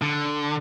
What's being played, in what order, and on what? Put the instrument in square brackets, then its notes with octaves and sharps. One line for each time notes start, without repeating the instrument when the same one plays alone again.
[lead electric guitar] D3